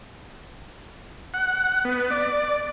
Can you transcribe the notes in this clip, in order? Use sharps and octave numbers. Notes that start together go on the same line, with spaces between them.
F#5
B3
D5